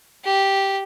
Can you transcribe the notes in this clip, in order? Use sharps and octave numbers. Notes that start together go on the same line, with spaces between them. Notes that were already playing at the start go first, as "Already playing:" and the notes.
G4